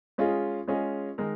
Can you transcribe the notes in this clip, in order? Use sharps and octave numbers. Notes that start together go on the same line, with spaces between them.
G#3 C#4 F4 G#4 D#5
G#3 C#4 F4 G#4 D#5
D#3 G#3 D#4 A#4